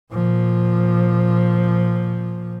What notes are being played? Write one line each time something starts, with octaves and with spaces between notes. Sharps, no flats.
A#2 F3